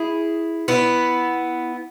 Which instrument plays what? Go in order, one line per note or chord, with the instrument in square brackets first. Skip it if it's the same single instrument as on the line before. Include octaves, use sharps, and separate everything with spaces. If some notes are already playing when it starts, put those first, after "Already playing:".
Already playing: [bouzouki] E4 G#4
B3 E4